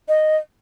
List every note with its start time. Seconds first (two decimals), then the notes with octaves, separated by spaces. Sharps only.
0.08 D#5